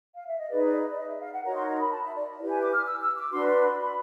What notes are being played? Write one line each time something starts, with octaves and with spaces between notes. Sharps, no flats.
F5
E5
D#5
D#4 G#4 B4 D5
D5
D5
D#5
E5
F5
F#5
D#4 F#4 A#4 C#5 A#5
C6
A#5
B5
A5
E5
D5
E4 G4 B4 D5
G#5
D6
F6
E6
E6
D6
D4 F#4 B4 C6
C6
B5
B5